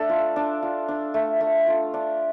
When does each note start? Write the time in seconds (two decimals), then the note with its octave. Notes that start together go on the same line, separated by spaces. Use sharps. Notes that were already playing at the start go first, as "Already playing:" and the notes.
Already playing: A3 D4 A4 D5
0.09 F4
0.36 D4
0.63 F4
0.88 D4
1.14 A3
1.41 A3
1.67 F4
1.94 D4